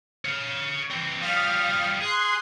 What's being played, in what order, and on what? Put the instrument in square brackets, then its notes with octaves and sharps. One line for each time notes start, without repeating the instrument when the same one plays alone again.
[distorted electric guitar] C#5 F5
E3 C4
[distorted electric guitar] F3 G3 [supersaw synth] F5 D#6 F6
[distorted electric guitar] G#4 [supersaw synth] C6 F#6 C7